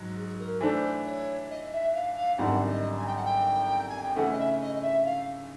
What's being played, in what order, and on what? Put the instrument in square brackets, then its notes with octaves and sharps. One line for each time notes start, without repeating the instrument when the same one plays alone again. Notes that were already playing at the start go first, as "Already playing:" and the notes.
Already playing: [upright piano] G#2 F#3
[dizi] G#4
A#4
[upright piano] E3 A3 D4 [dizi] C5
[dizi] C#5
D#5
E5
F5
F5
[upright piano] G#1 F#2 D3 G3 [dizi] F#5
[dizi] D#5
G#5
G5
F#5
G5
G#5
G5
[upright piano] C#3 E3 A3 C#4 [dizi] F#5
[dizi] D#5
E5
D#5
D#5
E5
F5